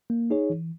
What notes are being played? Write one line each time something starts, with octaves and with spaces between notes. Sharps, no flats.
A#3
D#4 G#4 C#5
E3